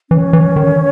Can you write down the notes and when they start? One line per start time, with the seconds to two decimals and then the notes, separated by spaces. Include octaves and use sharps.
0.10 E3 C#4
0.33 E3
0.56 D#3